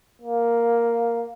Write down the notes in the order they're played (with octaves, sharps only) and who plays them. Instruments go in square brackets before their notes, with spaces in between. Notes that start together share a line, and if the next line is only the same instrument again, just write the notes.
[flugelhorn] A#3